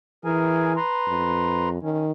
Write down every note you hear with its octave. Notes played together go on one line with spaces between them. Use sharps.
E3 G#4 A#4 G#5
B4 A#5 C6
F2
D#3 C#4